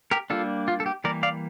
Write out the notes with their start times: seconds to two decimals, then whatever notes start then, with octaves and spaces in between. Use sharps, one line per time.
0.11 G4 A#4
0.30 G3 A#3 D4 F4 A4
0.68 F4
0.80 A4
0.86 G4
1.04 E3 G3 A#3 A#4 D5
1.23 D5 F5